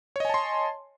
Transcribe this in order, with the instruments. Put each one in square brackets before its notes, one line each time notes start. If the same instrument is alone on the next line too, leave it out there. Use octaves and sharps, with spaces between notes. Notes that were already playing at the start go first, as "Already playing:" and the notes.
[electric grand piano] C#5
D#5
G#5
A5
C6